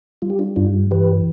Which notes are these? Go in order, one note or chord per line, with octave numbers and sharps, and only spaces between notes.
G3 F4
G4
D4 F4
G2 D4 F4
E3 G4 B4